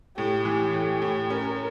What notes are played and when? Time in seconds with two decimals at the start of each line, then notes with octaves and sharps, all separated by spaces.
0.17 A2 G4
0.45 E3 G4
0.74 A2
1.02 A2
1.30 C#4 A#4